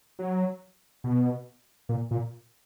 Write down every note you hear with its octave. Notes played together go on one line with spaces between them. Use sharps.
F#3
B2
A#2
A#2